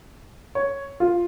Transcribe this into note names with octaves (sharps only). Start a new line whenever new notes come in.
C#5
F4